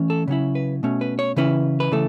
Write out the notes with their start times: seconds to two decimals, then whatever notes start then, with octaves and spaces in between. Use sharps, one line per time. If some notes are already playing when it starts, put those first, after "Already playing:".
Already playing: E3 A3 C#4
0.10 A4
0.28 C#3 F#3 C#4 E4
0.55 B4
0.83 B2 A3 C#4
1.01 B4
1.19 C#5
1.36 C#3 E3 C#4 E4 B4
1.80 B4
1.92 C#3 E3 A3 A4